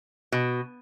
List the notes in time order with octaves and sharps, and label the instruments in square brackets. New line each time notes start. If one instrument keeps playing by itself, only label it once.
[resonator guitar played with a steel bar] B2